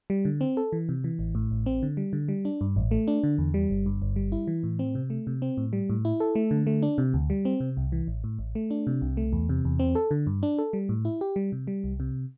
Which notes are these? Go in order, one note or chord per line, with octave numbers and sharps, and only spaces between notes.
G3
D3
C4
A4
E3
C3
E3
A1
A2
A1
C4
D3
G3
D3
G3
D4
G2
A1
A3
D4
D3
E2
G3
G1
G2
G1
G3
E4
E3
A2
C4
C3
A3
C3
C4
A2
G3
A2
E4
A4
A3
D3
A3
D4
C3
D2
G3
C4
C3
C2
E3
A1
A2
A1
A3
D4
C3
C2
A3
E2
C3
E2
C4
A4
D3
G2
D4
A4
G3
A2
E4
G4
G3
C3
G3
C2
C3